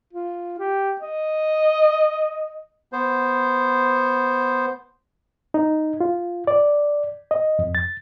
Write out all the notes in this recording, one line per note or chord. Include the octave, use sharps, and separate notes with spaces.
F4
G4
D#5
B3 C5
D#4
F4
D5
D#5
F2
A6